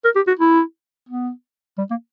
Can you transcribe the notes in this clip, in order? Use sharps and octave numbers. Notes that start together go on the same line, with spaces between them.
A#4
G4
F#4
E4
B3
G3
A#3